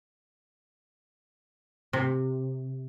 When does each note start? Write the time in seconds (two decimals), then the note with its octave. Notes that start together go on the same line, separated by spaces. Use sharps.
1.93 C3